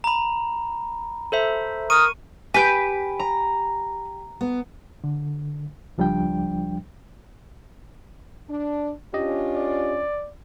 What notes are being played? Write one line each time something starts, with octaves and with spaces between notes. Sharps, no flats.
A#5 B5
A4 C5 E5
A#4 C#6 D#6 D#7
G4 B4 G#5 G6 D7
A#5
B3
D3
C#2 F3 G3 D4 G5
D4
C#4 D4 F4 G4 D#5
D5